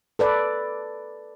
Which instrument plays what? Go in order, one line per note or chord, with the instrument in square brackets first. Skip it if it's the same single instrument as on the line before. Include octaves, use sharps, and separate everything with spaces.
[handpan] A4 B4 D5